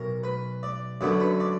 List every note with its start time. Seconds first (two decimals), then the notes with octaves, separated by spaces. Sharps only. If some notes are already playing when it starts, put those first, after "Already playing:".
Already playing: B1 B2 A#4
0.23 B4
0.63 D5
1.01 F#2 D3 F#3 B3 D5
1.20 B4
1.40 D5